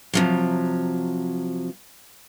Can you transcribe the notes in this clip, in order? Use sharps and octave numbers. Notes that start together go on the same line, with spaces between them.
C3 F3 F#3